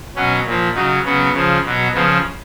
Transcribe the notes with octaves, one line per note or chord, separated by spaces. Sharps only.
B2 F#3 C#4
A#2 F3
C#3 F#3 D#4
C#3 F#3 B3
C#3 F3
B2 F#3
C#3 F3 B3